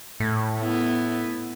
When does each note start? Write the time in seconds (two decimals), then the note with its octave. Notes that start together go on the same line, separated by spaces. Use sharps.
0.20 A2
0.60 B3 E4